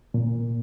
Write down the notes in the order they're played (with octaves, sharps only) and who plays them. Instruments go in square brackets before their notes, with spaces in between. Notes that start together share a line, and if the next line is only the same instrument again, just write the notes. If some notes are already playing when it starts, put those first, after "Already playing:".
[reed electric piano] A#2